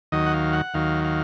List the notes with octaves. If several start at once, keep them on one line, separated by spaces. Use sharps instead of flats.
D#2 D#3 F#3 D#5
F#5
F5
F#5
D#2 D#3 F#3 F5
F5